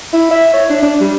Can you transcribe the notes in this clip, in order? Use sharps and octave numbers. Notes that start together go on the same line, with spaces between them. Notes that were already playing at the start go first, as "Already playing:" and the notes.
E4
E5
C#5
D4
D4
G3